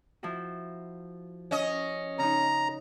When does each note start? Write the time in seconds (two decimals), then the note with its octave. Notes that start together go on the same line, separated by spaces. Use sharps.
0.23 F3 E4 F#4
1.51 C#4 D#5
2.19 C#3 D#4 A#5